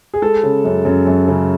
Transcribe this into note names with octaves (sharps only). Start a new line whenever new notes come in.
G#4
G#3 A4
C#3
F#2
F#2
F#2
C#3